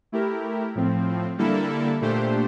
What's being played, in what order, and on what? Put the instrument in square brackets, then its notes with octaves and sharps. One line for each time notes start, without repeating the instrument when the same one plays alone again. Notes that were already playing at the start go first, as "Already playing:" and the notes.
[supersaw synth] A3 E4 G4 A#4
A2 F3 C4
D3 G3 A#3 E4 A4
A#2 A3 D4 G4 C5